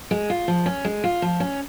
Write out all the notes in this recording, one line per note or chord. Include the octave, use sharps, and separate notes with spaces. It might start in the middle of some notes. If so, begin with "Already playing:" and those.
G#3
F4
F3
C#4
G#3
F4
F3
C#4